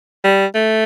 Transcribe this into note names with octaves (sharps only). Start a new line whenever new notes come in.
G3
A3